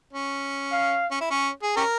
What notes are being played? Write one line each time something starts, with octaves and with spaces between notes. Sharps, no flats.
C#4
F5
C#4
E4
C#4
G#4
C#4 G4 A#4